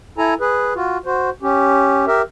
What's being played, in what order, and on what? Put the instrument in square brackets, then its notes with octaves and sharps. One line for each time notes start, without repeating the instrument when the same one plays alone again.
[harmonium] E4 A4 G#5 A#5
G#4 B4
F4 F#4
F#4 C5
C#4 G4
G4 A#4 E5